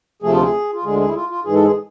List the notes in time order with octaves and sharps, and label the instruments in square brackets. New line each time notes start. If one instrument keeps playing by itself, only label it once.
[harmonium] D2 C3 F3 A3 G#4
F4
G#4
F4
D2 D3 G#3 G#4
F4
G#4
E4
F4
F4
G#2 E3 G#3 G#4
A4
G#4